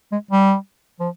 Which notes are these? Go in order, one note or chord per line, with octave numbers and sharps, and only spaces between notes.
G#3
G3
F3